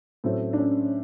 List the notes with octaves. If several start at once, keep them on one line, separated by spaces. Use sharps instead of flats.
A2 F#3 A3 C4
D4
C#4